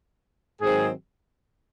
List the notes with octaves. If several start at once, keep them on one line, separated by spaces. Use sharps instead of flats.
G#2 D#3 F#3 C4 G#4